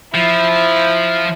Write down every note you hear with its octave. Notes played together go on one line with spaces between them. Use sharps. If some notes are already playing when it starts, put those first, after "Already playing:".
F3 E4